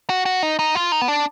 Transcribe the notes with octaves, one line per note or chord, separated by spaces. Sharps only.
F#4
F#4
D#4
D#4
F4
D#4
B3
D4